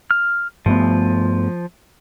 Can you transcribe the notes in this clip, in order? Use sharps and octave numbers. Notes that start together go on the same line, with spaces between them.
F6
G2 F3 A3 B3